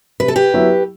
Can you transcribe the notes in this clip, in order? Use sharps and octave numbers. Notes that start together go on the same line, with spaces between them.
C3 B4
A4
G4 B4
F#3 B3 E4